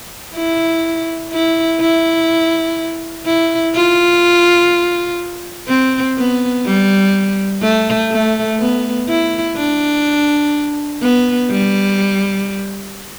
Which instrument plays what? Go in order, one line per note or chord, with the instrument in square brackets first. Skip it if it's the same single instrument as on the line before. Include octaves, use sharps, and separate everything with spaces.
[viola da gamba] E4
E4
E4
E4
F4
C4
B3
G3
A3
A3
B3
E4
D4
B3
G3